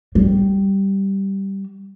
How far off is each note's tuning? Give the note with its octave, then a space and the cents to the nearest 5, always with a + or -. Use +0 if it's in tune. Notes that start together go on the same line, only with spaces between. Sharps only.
G3 -5